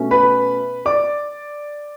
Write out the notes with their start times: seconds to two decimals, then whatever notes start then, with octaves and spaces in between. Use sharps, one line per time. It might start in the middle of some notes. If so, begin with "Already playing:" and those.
Already playing: B2 A3 C#4
0.11 B4 B5
0.85 D5 D6